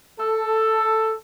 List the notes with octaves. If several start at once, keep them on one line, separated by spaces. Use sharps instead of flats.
A4